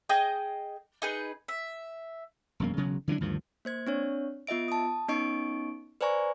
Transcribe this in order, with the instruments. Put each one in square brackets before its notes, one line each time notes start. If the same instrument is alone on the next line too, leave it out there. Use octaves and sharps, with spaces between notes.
[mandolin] G#4 D#5 G5 D#6
D#4 G#4 B4
E5
[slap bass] E1 F#2 A#3
E1 C#3 F#3
D3 E3 F#3 D4
D2 G2 D#3 F3
[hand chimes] A#3 C5 G#6
C4 D4 C#5
B3 F4 D#5 E5 D7
A5 D#6
B3 C#4 D#4 D#5 C#6 D7
B4 C5 D5 G#5 A#5 C#6